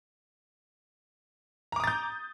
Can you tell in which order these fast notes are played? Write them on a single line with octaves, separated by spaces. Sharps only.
A#5 D6 D#6 A6 G6